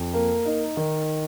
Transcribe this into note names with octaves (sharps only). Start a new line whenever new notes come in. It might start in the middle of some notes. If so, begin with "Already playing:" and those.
Already playing: F2
A#3
D#4
D#3